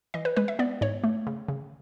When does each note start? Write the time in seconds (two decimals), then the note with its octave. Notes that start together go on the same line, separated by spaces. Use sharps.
0.14 E3 D#5
0.25 B4
0.37 G#3 B4
0.48 E5
0.59 B3 D5
0.81 G#2 C#5
1.04 A3
1.27 C#3
1.48 C#3